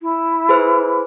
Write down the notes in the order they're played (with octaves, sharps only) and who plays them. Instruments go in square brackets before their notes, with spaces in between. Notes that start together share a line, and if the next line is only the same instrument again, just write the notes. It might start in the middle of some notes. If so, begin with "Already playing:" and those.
[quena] E4
[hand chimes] G#4 B4 C5